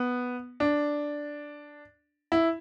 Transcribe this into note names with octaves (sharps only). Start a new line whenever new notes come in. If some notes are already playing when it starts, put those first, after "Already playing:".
Already playing: B3
D4
E4